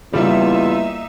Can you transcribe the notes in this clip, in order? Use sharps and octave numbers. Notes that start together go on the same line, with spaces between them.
E2 C#3 G3 A#3 D#4 F4 E5